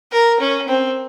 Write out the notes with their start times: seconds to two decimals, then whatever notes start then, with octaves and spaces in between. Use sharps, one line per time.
0.12 A#4
0.40 C#4
0.68 C4